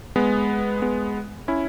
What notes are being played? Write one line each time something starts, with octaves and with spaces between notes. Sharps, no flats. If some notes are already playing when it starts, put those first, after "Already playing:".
G#3 B3
G#3 B3
C#4 E4